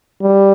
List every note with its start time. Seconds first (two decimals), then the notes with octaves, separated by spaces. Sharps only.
0.22 G3